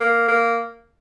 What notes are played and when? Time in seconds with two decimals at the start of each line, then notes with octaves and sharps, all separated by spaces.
0.01 A#3
0.28 A#3